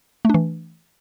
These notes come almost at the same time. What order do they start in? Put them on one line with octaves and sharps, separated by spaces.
A3 D4 E3